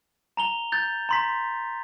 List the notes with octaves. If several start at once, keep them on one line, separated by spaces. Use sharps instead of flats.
A#5 F7 G7
G6 A6
A#5 C6 B6